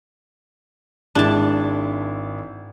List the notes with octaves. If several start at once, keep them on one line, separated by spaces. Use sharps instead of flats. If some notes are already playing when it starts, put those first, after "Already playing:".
G#1 G#3 D4 E4 A5